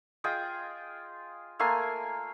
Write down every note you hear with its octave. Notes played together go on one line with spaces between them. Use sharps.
F4 G#4 D#5 G5
A3 A#3 G#5 C6